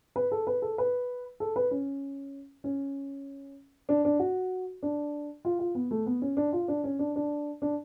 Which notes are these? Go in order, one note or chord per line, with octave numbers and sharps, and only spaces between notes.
B4
A4
B4
A4
B4
A4
B4
C#4
C#4
D4
D4
F#4
D4
F4
F4
B3
A3
B3
C#4
D4
F4
D4
C#4
D4
D4
D4